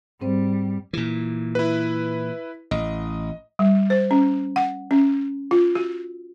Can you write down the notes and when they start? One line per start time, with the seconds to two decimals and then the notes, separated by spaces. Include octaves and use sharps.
0.21 G#2 G3 C4 C5
0.93 A#2 E3
1.55 E4 B4
2.71 A1 D#5
3.59 G3
3.90 C5
4.11 C#4
4.56 F#5
4.91 C#4
5.51 F4
5.75 F#4